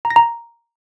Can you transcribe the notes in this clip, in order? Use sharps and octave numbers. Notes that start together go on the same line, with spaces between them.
A#5
A#6
A#5